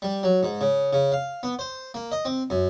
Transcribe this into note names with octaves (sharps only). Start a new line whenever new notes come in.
G3
F#3
G#2
C#3
C#3
F5
B3
C5
A#3
D#5
C4
F#2